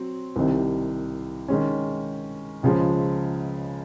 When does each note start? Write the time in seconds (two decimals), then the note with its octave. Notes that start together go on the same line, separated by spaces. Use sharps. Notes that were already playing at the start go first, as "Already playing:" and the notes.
Already playing: F#3 C4
0.36 C2 C3 D#3
1.48 D#3 G#3 C#4
2.63 C#2 C#3 F3 G#3